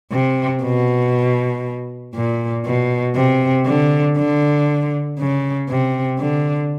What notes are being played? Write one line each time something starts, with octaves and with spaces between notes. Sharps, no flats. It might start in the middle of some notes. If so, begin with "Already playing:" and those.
C3
B2
A#2
B2
C3
D3
D3
C#3
C3
D3